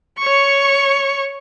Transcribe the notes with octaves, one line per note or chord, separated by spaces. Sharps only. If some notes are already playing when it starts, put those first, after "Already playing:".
C#5 C#6